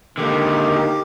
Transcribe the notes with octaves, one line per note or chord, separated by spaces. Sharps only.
D3 D#3 A#3 G4